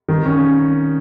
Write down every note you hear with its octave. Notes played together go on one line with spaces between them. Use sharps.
D#3
C#4